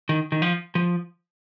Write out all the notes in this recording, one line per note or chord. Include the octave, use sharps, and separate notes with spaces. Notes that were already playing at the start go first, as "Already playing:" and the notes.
D#3
D#3
F3
F3